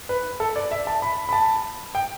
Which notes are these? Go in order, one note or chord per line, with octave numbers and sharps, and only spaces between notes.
B4
A4
D5
E5
A5
B5
B5
A5
G5